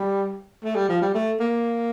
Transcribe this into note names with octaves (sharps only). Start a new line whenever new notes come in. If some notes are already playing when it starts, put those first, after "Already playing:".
Already playing: G3
A3
G3
F3
G3
A3
A#3